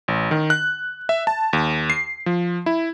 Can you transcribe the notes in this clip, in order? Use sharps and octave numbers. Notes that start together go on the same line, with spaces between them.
A1
D#3
F#6
E5
A5
D#2
C7
F3
E4